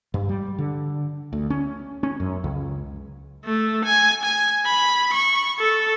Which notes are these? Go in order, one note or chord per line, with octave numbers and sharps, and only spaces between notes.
G2
G3
D3
D2
C#4
C#4
F#2
C#2
A3
G#5
G#5
B5
C#6
A4